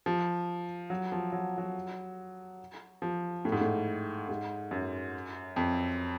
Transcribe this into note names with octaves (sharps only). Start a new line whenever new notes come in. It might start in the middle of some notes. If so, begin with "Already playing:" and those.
F3
F#3
F3
F#3
F#3
F3
A2
G#2
A2
G#2
F#2
F2